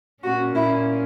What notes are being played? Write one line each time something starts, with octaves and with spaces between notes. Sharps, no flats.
A#2 A#3 C#4 F#4
E4